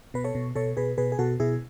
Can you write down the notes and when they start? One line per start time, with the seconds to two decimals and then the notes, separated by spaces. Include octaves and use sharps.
0.14 B2 B4
0.24 A4 C#5
0.35 B2
0.55 B2 A4 C#5
0.77 B2 G#4 B4
0.98 B2 G#4 B4
1.12 G#4
1.19 B2 F#4 A4
1.40 B2 E4 G#4